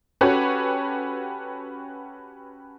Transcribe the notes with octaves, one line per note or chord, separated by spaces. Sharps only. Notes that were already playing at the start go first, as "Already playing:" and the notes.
C#4 F#4 G4 A4 B4 C#5